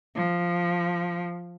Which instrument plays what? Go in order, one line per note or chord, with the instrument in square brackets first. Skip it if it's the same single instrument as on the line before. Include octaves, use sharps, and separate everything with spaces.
[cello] F3